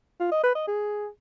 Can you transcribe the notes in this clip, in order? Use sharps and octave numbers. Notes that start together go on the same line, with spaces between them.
F4
D#5
B4
D#5
G#4